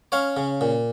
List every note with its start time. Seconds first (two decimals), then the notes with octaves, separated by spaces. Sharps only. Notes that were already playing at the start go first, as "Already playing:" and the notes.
0.12 C#4 C#5 F5
0.37 C#3
0.61 A#2